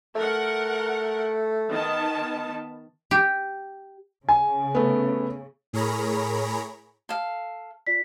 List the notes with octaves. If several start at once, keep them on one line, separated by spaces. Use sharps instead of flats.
A3 A#4 F#5
D#3 B3 A5
G4
C#3 G#5
A3 B3
A2 G#4 A#4 C#5 A#5 B5
A4 F5
F4 D5 B6